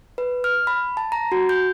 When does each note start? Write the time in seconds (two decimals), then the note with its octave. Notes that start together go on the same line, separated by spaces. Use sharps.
0.18 B4
0.44 F6
0.67 B5
0.97 A5
1.12 A#5
1.32 F#4
1.49 G6